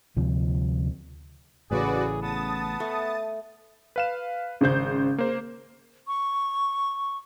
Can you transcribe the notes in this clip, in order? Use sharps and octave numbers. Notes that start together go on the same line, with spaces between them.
D2 C3 F3
A1 A2 C#3 F#4 G#4 B4 D5
B3 A5 D#6 A6
A3
B4 F5 E7
G#1 C#3 C5 G6
A#3 C5
C#6